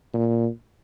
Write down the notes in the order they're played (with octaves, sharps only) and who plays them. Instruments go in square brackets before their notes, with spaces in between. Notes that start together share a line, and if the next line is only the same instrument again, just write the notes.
[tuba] A#2